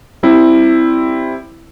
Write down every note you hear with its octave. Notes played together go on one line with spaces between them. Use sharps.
G3 C4 E4